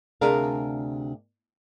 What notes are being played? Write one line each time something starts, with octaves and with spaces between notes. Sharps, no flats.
D2 C3 D4 G#4 A#4 F5